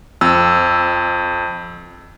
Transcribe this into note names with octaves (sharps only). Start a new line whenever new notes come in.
F2 E6